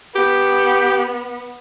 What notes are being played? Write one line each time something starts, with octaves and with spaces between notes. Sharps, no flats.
B3 G4